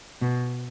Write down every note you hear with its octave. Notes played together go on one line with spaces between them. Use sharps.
B2